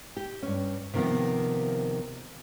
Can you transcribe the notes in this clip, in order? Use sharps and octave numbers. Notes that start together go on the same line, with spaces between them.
G4
G2 C#4
C3 D#3 F3 A#3 B3